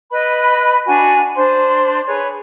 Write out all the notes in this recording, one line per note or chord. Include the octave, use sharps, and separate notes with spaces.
B4 D#5 B5
D4 F#4 G#5
D4 C5 C6
G#4 B4 C#5